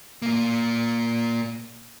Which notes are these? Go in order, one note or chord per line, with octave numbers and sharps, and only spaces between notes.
A#2 A#3